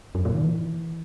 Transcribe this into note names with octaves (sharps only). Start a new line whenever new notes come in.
F#2
A#2
D#3
E3